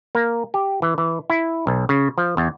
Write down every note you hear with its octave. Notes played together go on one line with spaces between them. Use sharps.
A#3
G4
E3
E3
E4
B1
C#3
F3
E2